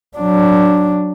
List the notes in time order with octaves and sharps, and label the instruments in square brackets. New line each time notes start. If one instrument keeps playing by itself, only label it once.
[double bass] F#3 D4